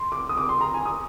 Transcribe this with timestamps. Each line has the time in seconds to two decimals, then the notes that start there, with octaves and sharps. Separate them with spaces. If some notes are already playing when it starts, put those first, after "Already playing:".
Already playing: C6
0.12 D6
0.29 D#6
0.38 D6
0.49 C6
0.61 A#5
0.74 G#5
0.86 D#6